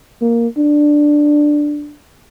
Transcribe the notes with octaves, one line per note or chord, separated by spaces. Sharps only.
A#3
D4